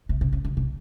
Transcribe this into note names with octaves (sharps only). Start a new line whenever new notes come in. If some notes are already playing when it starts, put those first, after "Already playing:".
C3
C3
C#3
D3
C3